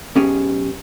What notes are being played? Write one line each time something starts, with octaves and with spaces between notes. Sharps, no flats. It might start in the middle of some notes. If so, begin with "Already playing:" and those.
B1 B3 C#4 G4 G#4